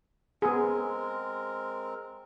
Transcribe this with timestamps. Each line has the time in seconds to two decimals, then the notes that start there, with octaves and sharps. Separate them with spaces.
0.42 G#3 B3 C4 G#4 A#4